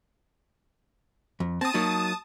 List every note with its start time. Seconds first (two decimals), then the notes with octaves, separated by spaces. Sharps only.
1.40 F2
1.61 C4 A5 D#6
1.74 F#3 A#3 D#4